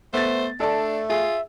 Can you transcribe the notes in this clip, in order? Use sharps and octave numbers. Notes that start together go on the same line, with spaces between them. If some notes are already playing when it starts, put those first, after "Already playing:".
A3 B3 C5 A6
A3 D4 A4 D5 A5
F4 G#4 E5